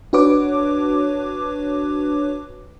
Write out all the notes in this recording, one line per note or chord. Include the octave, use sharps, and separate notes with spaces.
D4 F#4 B4 C#5 D6